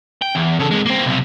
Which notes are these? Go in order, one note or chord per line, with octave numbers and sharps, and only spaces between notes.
G5
E2
C#3 A4
C3 G#3
A#3 C4
B1 C3